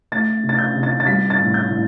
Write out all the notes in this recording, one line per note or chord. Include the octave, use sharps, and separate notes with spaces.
A3 A6
C3
A6
G6
C3
A6
A6
G3 B6
A6
A2
G6
A2